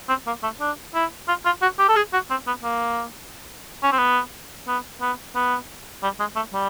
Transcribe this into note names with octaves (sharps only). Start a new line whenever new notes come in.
C4
A#3
A3
D4
E4
F4
F4
F#4
G4
A4
G#4
F#4
C4
B3
A#3
C#4
C4
B3
B3
B3
B3
G3
G#3
A3
G3